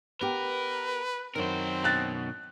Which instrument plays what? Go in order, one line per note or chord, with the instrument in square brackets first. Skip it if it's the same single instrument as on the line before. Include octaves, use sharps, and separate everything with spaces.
[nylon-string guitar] B3 G4 [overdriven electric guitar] A#4 [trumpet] B4
[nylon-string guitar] F#2 D#3 [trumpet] C4 [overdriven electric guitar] A#4 C5
[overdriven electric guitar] B2 [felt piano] F#6 A6